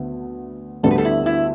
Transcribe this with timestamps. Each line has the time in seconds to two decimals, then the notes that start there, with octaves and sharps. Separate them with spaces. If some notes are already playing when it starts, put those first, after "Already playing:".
Already playing: D2 D3 B3
0.83 D2 D3 G3 B3 A4
0.91 B4
0.98 A4
1.05 E4
1.26 E4